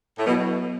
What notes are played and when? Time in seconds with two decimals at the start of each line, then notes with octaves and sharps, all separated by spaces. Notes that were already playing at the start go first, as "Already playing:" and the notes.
0.18 A2
0.26 B2 F#3 B3 E4